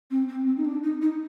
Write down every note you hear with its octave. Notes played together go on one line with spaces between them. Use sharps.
C4
C4
C4
D#4
D4
D#4
D#4